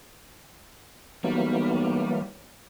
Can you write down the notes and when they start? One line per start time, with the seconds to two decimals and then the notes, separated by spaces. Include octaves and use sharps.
1.24 B1 E3 F#3 G3 A#3